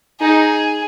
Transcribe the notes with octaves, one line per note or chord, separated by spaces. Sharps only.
D#4 G#4